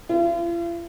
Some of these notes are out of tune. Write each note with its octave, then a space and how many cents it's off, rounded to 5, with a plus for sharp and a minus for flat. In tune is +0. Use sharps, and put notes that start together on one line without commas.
F4 -45